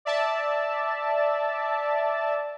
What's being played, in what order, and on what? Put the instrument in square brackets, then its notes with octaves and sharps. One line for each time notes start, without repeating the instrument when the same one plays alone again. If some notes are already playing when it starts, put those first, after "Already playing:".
[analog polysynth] D5 E5 A5